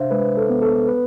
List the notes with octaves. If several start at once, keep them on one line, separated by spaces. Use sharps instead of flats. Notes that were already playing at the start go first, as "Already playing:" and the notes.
Already playing: C3 D4 C5 E5 F5
G#3 B4
A4
B3
A4
B4